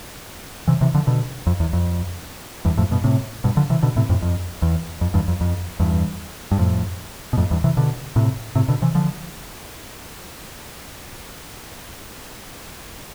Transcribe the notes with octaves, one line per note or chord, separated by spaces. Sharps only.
C3 E3
C3 E3
D3 F3
B2 D3
F2
E2
F2
E2 G2
F2 A2
G2 B2
A2 C3
G2 B2
D3 F3
C3 E3
B2 D3
A2 C3
F2 A2
F2
E2
F2
E2 G2
F2
F2
E2 G2
G2
F2 A2
B2
F2 A2
E2 G2
C3 E3
B2 D3
A2 C3
A2 C3
B2 D3
C3 E3
D3 F3